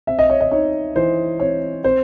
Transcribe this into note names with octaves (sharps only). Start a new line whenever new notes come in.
C4 E5
D#5
C#5
D#5
D#4 C#5
E3 C5
C4 C#5
C4 C5